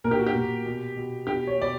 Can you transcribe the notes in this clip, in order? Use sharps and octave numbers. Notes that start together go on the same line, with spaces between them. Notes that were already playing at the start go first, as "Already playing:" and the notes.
A#2 A#4
G4
F#4
G4
A#2
B2
B2
B2 G4
C#5
B2 D5